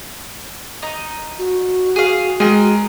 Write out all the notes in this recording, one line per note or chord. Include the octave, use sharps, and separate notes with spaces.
D#4
F#4
G#4 F5
G#3 G#4 A#4 G5